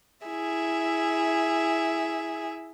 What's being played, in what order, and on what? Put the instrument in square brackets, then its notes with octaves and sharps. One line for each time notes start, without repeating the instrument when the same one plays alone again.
[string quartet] E4 G#4 E5